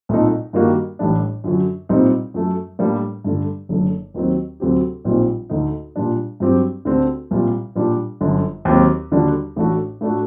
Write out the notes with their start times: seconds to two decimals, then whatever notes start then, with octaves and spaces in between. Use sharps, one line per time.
0.09 C2 A#2 A3 D#4
0.53 G2 D#3 G3 A#3 F#4
0.99 A1 A2 G3 D4
1.44 F#2 D3 F#3
1.89 C2 A#2 G3 C4 D#4
2.34 F#2 F#3 A3
2.79 A2 G3 A#3 D4
3.24 G2 D3 A3
3.69 F#1 F#2 D3 A3
4.14 D#2 D#3 F#3 C4
4.60 D2 C3 F#3 C4 G4
5.05 A#1 A#2 G3 C4 D#4
5.49 D2 D3 A3 D#4
5.96 A#2 G3 D4
6.40 G2 F#3 C4 G4
6.85 D2 D3 A3 C4 G4
7.31 C2 A#2 G3
7.75 A#2 G3 D4 G4
8.21 G1 F#2 D3
8.65 D#2 D#3 F#3 C4 G4
9.11 D#2 D3 G3 D4 F#4
9.56 A1 A2 A3 D4 F#4
10.01 A2 A3 D4 F#4